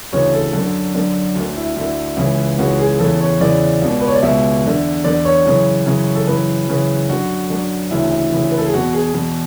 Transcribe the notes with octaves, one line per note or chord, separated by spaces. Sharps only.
D2 C#3 E3 C#5
A4
F#2 D3
F#2 D3
D2 D3
E4
D2 D3 E4
C#2 C#3 E3
C#2 C#3 E3 F#4
G#4
E2 C#3 E3 A4
C#5
E2 C#3 E3 D5
C#2 B2
B4
C#5
D5
C#2 B2 E5
E2 D3
E2 D3 D5
C#5
F#2 C#3 E3
F#2 C#3 E3
A4
F#2 C#3 E3 B4
F#2 C#3 E3
F#2 D3 F#4
F#2 D3
D2 C#3 E3 E4
E4
D2 C#3 E3
B4
A4
G#4
E2 B2 F#4
G#4
E2 B2